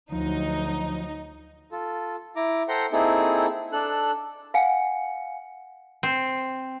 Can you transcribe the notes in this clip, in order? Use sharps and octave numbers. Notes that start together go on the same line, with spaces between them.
D2 F3 F#3 D#4
F4 A4
E4 A#5 D6
A4 C5 F#5 G5 A#5 C6
A#3 C4 D#4 E4 G#4 A4
D4 A4 F#6
F5 F#5 G#5 C#7
C4